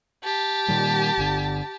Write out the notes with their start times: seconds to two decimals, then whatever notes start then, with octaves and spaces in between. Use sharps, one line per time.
0.24 G4 A5
0.68 A#2 D#3 G3
1.17 G1 D3